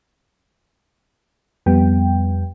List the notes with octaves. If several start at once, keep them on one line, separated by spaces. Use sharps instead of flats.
F2 G3 B3 G5